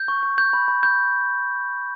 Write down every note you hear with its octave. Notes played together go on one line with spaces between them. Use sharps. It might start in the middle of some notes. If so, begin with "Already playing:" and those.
Already playing: G6
C#6
C#6
G6
B5
B5
G6